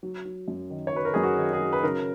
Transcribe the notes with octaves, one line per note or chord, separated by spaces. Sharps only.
F#3
F#3
F#2
D#3
C#5
F#3 B4
A#4
F#2 G#4
F#4
D#3
G#4
F#3
B4
C#3 A#4